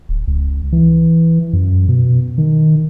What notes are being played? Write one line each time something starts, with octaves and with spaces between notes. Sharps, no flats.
D1
C#2
E3
F#2
B2
D#3